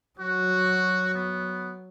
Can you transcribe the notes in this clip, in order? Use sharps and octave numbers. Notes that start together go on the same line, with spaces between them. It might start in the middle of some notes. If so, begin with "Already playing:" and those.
F#3 F#4
B3